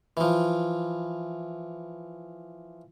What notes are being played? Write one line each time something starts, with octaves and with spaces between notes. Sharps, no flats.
E3 F3